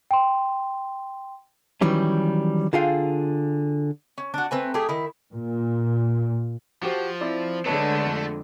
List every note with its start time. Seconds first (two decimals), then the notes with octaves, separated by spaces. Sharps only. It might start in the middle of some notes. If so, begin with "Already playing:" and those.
0.11 G5 C6
1.81 D#3 E3 F#3 G3 C#4
2.73 D3 F4 G#4 F5 G5
4.18 C#4
4.34 D4 F#4
4.51 A3 C4 B4 G#5
4.74 A3 G4 G#4
4.89 D#3 E4
5.33 A#2
6.83 F3 F#4 G4 C5
7.21 C4 E4 D5
7.65 D3 G#3 A3 B4 C#5 A5
8.05 F2